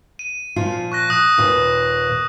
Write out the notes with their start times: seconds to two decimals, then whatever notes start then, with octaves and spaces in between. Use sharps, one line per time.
0.19 D#7
0.56 A#2 F3 F4
0.92 C#6 F#6 A#6
1.10 D#6 F#6
1.38 D#2 A#2 B4